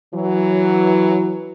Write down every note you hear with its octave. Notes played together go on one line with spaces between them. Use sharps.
E3 F#3